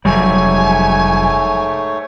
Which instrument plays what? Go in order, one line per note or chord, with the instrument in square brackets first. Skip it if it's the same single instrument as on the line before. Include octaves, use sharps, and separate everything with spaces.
[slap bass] F1 F#3 G3 [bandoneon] G#2 A3 C#5 [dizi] G#5